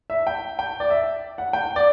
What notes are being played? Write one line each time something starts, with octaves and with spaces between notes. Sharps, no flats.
E5
G5
G5
D5
E5
F#5
G5
D5